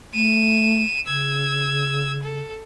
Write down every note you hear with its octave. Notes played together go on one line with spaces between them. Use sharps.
A3 D#7 E7
C#3 E6 G#6
A4